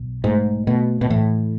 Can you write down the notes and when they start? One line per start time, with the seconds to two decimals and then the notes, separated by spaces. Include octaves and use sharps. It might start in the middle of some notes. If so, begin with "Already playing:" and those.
Already playing: B1
0.24 G#2 A3
0.67 B2 A3
1.01 B2
1.10 A2 E3